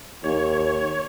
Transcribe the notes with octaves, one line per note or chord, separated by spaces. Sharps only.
D#2 C#5